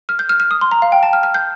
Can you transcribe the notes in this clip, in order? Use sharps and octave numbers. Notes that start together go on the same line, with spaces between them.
F6
G6
F6
F6
D#6
C6
A#5
F5
G5
A5
F6
F6
G6